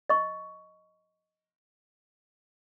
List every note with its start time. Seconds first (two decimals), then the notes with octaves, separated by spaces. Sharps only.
0.09 D#5 C#6